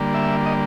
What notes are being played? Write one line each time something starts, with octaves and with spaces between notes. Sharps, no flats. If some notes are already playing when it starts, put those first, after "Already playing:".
Already playing: D3 G3 A#3
E5
D#5